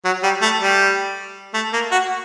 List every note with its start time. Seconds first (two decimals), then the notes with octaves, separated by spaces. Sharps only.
0.05 F#3
0.23 G3
0.42 A3
0.61 G3
1.54 A3
1.73 A#3
1.92 F#4